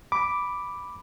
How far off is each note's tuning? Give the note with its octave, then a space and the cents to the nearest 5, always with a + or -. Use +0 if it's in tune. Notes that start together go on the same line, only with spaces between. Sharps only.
B5 +0 D6 +0